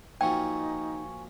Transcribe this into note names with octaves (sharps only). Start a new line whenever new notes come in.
A#2 F3 F#3 D#4 G5 G#5 C#6